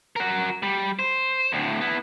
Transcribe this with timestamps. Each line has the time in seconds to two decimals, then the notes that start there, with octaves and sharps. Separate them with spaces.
0.16 F#4 A#4
0.63 G3
0.99 C5
1.53 D2 A2
1.81 B3 E4